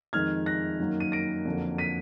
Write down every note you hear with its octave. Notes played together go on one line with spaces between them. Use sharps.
F2 D#3 G#3 F6 G#6
F#6 A#6
F#2 D#3 F#3 A#3
D#7
A#6 D7
F2 D3 F#3 A#3
B6 D#7